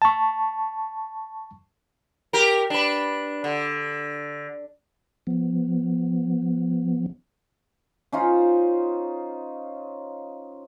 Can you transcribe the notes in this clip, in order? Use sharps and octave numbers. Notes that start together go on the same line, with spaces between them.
A5 C#6
G4 A#4
D4 B4
D3
F3 B3
C#4 D#4 F4 C5